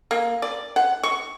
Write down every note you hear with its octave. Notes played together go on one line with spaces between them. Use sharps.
A#3
D5
F#5
C#6